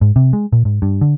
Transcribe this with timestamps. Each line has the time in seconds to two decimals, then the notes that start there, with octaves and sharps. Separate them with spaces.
0.01 G#2
0.16 C3
0.33 G#3
0.52 A#2
0.65 G#2
0.82 G2
1.01 D3